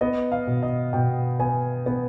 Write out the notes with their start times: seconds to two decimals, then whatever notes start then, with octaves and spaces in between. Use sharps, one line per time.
0.01 B3 D#5
0.32 F5
0.47 B2
0.63 D#5
0.93 B2 G5
1.39 B3 G#5
1.86 B3